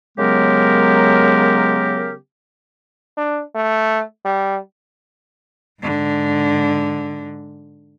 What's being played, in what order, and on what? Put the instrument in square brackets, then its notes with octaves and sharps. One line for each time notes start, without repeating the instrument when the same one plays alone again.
[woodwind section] C#3 F#3 G#3 B3 G4 A#4
[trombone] D4
A3
G3
[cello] G#2 D3